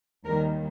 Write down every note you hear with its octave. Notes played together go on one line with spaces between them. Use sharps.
D#2 D#3 G3 A#4